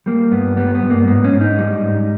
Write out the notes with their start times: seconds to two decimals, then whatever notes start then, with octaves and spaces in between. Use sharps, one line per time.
0.06 G3 A#3
0.31 G2 B3
0.57 G3 B3
0.75 B3
0.83 G2
0.90 A#3
1.07 G#2 B3
1.24 C#4
1.32 G#2
1.41 D#4
1.58 G3
1.83 G#2